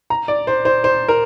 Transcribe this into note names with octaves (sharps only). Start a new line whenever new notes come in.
A#5
D5
C5
C5
C5
A#4